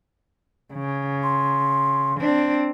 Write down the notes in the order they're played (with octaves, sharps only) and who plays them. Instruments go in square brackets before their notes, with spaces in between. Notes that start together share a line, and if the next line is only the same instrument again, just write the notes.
[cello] C#3
[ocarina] C6
[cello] C4 D4